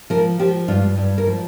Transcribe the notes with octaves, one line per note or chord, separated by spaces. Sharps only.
F3 A#4
F3 G4
G2 F4
G2
A#4
F3